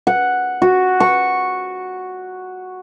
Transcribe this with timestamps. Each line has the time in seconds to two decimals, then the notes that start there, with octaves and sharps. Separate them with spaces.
0.07 F#5
0.62 F#4
1.00 C#6